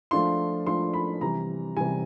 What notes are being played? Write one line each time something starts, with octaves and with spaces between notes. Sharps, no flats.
F3 A3 D4 F4 C6
F3 A3 D4 F4 C6
B5
C3 E3 G3 A#5
C3 E3 G3 G#5